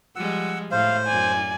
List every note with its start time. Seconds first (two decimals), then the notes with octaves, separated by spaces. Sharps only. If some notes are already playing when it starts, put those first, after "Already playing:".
0.16 F3 G3 G#3 F#5 E6
0.72 A2 C5 F5
1.08 F#2 D5 G#5